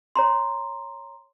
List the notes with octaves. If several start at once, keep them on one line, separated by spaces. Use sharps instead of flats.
C#5 A#5 C6